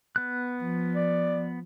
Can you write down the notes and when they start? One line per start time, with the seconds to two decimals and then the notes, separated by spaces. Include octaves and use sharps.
0.16 B3 F#6
0.62 F3
0.94 D5